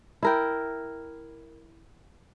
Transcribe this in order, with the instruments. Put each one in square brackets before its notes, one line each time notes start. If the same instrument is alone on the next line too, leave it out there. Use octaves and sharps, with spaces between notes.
[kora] E4 A#4 G5